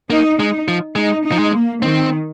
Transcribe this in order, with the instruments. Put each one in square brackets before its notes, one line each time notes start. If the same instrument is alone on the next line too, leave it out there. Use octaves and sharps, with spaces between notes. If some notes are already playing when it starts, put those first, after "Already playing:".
[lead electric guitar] A#3 [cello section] D#4
[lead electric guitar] G#3 [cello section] D#4
[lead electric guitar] F3
[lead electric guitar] G#3 [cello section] D#4
[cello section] D#4
[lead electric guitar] F3
G#3
[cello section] A#3
[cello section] D#3 [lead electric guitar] C4